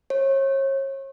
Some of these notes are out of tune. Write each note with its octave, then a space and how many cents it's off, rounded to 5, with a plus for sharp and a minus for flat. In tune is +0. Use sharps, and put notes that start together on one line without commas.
C#5 -35